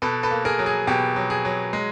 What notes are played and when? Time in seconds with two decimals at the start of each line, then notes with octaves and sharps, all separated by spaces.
0.02 B2 A4 B4
0.23 A4 B4
0.31 A#3
0.45 G#4 A#4
0.59 F#3
0.66 G#4
0.87 B2 G4
1.16 F#3
1.30 G#4
1.45 F#3
1.73 G#3